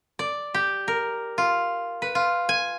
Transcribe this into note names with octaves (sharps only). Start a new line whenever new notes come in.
D5
G4
A#4
F4
B4
F4
G#5